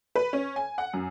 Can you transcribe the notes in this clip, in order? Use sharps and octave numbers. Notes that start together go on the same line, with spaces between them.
B4
C#4
G#5
F#5
F#2